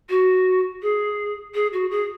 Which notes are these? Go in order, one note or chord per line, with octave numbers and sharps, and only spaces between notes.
F#4
G#4
G#4
F#4
G#4